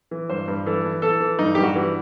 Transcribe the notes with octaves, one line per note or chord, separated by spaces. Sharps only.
E3
G2 C5
G2
E3 A4
E3
E3 A4
E3
G2 D#4
G2 G4
F#4
E3